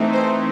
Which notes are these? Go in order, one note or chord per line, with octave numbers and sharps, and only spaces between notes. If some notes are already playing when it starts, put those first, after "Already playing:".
Already playing: E3 A3 C4 D#4
C5